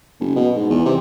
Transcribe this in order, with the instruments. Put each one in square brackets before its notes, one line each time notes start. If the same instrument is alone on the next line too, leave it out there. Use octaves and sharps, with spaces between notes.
[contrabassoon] F#1
B2
G#2
E2
C3